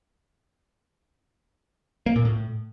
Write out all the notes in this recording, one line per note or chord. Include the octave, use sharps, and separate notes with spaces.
A#3
A#2
A2